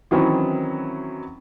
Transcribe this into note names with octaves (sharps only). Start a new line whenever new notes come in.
D#3 E3 F#3 C4 C#4 E4